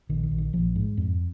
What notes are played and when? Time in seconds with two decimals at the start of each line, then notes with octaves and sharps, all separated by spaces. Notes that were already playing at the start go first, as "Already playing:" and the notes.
0.09 A#1 D#3
0.23 D#3
0.31 A#1
0.38 D#3
0.53 A#1 F3
0.76 G#2
0.97 F2